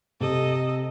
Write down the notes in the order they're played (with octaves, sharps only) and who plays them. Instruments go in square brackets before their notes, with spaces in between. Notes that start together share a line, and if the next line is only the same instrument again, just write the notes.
[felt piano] C3 [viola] A4 D#5